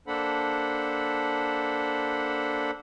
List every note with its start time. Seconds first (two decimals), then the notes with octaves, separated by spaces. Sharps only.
0.07 A#3 D4 A4 C5 F#5 B5